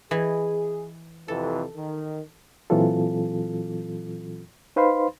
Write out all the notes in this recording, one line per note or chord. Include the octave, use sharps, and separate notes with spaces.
E3 G#4 D#5 G#5
F2 C3 E3 A4
D#3
A#2 E3 F#3 C4 F4 A4
D#4 B4 C5 F5 B5 C6